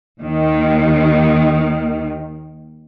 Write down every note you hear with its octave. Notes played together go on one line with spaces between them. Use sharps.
D#2 D#3